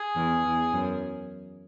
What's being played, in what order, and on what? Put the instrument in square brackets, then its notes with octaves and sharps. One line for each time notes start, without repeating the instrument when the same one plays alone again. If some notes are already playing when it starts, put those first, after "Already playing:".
Already playing: [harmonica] G#4
[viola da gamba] E2
E2
F#2